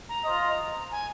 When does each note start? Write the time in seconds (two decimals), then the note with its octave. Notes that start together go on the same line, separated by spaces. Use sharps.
0.09 A#5
0.24 F4 C5 D#5
0.91 G#5